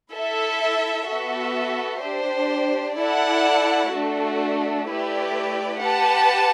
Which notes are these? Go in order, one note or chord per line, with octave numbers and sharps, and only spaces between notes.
E4 A4 E5
B3 F#4 A4 E5
D4 G4 C5
E4 A4 D5 F#5 A5
A3 D4 F#4 A4
A3 E4 G4 B4 D5
G4 B4 F#5 A5